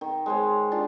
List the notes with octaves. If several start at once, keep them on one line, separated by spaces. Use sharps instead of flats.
D#3
G#3 C5 C#5
D4 F4 G4